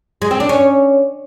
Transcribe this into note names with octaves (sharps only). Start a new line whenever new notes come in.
G#3
C4
D4
C#4